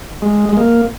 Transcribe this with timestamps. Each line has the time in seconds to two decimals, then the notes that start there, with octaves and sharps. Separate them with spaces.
0.22 G#3
0.49 G#3
0.57 A#3